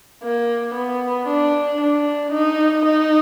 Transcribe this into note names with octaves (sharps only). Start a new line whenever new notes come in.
A#3
B3
D4
D4
D#4
D#4